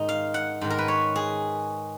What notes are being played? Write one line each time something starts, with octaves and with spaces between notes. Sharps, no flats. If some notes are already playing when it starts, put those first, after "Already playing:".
Already playing: G#2 D#3 D#4
F5
F#5
G#2 D#3
A#4
B4
C#5
G#4